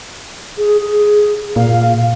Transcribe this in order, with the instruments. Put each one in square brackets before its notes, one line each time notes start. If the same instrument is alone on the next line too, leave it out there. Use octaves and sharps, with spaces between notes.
[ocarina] G#4
G#4
[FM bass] A#2 [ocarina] F5